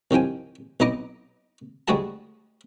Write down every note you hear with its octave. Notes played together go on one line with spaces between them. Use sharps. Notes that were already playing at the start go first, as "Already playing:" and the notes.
C2 D#3 F3 G5 G#5
B1 B3 D#4 D#5 A#5 D6
D2 G3 G#3 F#4 G#4 A5